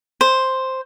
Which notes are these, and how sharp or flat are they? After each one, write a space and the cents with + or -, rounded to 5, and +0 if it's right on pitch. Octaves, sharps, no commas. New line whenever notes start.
C5 +0